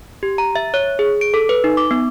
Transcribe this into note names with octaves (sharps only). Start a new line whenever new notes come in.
G4
A#5
E5
C#5
G#4
D7
A4
B4
D#4
D6
B3